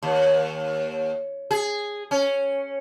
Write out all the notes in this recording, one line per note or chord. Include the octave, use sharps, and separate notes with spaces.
D#2
G#4
C#4